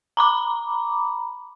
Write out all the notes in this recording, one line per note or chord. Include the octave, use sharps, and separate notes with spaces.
A#5 B5 D6